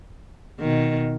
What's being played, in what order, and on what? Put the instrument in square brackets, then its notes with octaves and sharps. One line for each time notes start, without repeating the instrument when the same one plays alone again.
[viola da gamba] B2 D#3